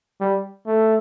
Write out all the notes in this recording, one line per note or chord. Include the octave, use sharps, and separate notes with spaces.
G3
A3